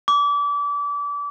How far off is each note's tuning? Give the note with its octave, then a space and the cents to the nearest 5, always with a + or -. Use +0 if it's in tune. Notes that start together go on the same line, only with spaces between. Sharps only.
D6 -30